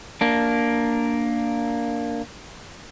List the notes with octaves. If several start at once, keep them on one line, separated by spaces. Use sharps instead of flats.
A#3 D4